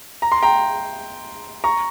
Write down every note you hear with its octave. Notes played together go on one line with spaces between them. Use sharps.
A#5
C6
G5 A#5
A#5 C#6